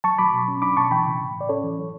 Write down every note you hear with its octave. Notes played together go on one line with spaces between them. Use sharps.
F#3 A5 C#6
F#3 B5 D6
B2
C#4
D4 B5 D6
B2 A5 C#6
E3 G5 B5
C#3
A2
A2
D5
C#4 A4 C#5
E3
F#3